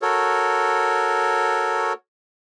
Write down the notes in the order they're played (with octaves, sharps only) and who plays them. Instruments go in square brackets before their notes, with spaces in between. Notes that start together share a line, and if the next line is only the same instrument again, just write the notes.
[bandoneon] F#4 A4 A#4 C#5